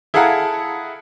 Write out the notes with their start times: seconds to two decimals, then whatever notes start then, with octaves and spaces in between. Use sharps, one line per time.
0.14 E4 G#4 A4 F5 F#5 A#5